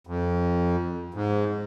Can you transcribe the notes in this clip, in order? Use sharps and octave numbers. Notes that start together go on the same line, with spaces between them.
F2
G#2